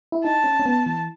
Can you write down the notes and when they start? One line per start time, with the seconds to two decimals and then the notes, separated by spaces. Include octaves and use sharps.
0.12 E4
0.24 D#4 A5
0.44 C#4
0.60 C#4
0.66 B3
0.86 E3